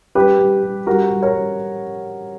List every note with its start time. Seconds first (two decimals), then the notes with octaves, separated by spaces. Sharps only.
0.15 G3 G4 B4
0.39 G3
0.63 G3
0.87 G3 F#4 A#4
1.10 G3
1.23 A#4 C#5
1.34 G3